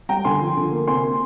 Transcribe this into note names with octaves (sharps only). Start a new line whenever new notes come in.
G3 G5 A#5
D3 G#5 C6
F3
D3
A#3
C3 G#5 C6
A#3